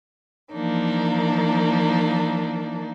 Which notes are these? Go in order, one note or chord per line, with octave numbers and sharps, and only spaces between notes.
E3 F3 A#3 D4 D#4